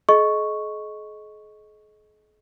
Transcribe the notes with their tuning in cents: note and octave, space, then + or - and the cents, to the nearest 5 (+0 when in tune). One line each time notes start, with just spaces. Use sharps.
G#4 +45 D#5 +0 C#6 +0